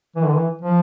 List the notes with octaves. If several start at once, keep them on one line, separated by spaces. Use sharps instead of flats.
E3
D3
E3
F3